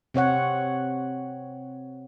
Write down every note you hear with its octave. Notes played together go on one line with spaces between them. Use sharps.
C3 C4 C#5 F#5